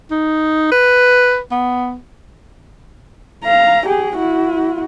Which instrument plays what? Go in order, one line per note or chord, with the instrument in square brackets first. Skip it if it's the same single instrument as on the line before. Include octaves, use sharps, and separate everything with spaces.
[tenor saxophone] D#4
B4
B3
[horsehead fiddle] F5 A#5
G4 G#4
E4 F#4